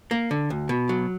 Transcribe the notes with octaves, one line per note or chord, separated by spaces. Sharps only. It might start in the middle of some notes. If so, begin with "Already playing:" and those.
A#3
D3
D2
B2
F#3